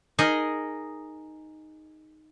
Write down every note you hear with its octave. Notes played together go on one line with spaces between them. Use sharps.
D#4 G#4 A#4 D#5